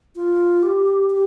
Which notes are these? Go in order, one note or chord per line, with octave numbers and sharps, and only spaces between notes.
F4
G4
G4